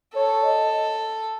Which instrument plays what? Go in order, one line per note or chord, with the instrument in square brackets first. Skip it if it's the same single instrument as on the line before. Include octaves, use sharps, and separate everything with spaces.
[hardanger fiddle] A4 [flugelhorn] C#5
[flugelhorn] D#5